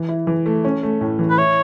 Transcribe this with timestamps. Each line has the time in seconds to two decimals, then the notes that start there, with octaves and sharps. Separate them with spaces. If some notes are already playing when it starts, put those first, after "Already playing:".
Already playing: E3
0.09 E4
0.27 E3
0.46 A3
0.65 C#4
0.83 A3
1.01 A2
1.19 E3
1.30 B4
1.38 E4 C#5